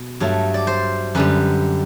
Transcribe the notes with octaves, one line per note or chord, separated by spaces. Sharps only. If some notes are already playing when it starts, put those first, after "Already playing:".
Already playing: B2
G2 F#3 A3
D5
C5
F#2 D3 G3 B4